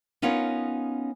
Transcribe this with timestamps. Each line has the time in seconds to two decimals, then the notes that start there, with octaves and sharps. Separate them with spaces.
0.22 B3 C#4 D#4 F4 A#4 C#5